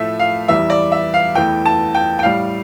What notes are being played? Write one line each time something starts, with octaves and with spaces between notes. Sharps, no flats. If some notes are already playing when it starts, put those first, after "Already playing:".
Already playing: A2 F3 A3 E5
F5
E2 E3 G3 E5
D5
E5
F5
E2 E3 A3 G5
A5
G5
G5
A2 G3 F5